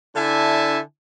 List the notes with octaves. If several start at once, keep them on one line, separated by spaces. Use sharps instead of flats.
D3 D4 E4 E5 G#5 A5